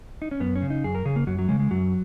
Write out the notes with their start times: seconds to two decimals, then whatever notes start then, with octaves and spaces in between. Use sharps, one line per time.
0.22 D#4
0.31 C#4
0.40 F#2 B3
0.55 C#4
0.62 C#3
0.70 D#4
0.84 F#2 G#4
0.95 A#4
1.05 C#3 G#4
1.16 A#3
1.27 F#2 F#3
1.39 F#3
1.49 C#3 G#3
1.60 G#3
1.71 F#2 F#3